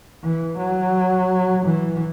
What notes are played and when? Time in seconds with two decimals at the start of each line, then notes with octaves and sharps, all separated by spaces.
0.23 E3
0.58 F#3
1.66 E3